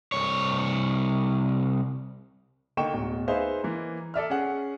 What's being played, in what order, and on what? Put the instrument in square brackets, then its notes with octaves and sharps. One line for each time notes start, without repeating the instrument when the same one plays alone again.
[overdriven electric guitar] C2 C#5
[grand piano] D3 A#3 D#4 G5 C#6 E7
D1 B2
D#4 G#4 B4 C5 E5 F5
E3 A#3
A4 D5 E5 F6
C#4 G#4 F#5